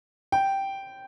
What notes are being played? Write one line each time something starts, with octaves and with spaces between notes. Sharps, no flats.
G5